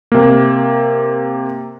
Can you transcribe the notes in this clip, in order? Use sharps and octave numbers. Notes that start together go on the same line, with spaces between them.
C3 A#3